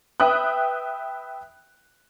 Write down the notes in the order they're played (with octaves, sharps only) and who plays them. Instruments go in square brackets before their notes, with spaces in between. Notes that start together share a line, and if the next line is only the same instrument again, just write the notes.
[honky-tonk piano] B4 E5 G5 D#6 F#6